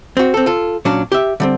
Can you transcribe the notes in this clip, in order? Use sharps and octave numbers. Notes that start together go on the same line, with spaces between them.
C4 F#4
C4 A4
F4 A4
A#2 F#3 C#4 D4
G4 E5
D3 G3 C4